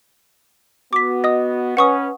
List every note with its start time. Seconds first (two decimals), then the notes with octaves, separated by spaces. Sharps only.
0.93 B3 F#4 D6 B6
1.24 D#5 D#6
1.77 C#4 B4 F#5 C#6 D#6